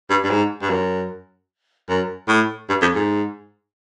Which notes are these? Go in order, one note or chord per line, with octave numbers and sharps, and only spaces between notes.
G2
G2
G#2
G2
F#2
F#2
A2
G2
F2
G#2